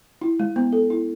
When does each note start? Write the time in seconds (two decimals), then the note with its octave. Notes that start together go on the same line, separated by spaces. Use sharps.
0.21 E4
0.40 G#3
0.56 B3
0.73 A4
0.90 E4